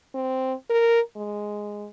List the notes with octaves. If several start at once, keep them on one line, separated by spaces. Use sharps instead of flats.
C4
A#4
G#3